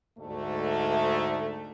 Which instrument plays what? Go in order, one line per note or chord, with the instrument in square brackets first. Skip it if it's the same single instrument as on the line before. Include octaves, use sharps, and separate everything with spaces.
[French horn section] D2 G#2 A3